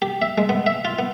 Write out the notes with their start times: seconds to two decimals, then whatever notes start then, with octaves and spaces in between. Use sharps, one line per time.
0.02 G4
0.22 E5
0.38 G#3
0.49 B3
0.66 E5
0.85 F4
0.99 B3